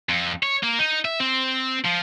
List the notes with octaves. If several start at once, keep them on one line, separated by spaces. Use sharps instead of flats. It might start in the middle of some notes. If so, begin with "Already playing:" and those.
F2
C#5
A#3
D#4
E5
C4
F3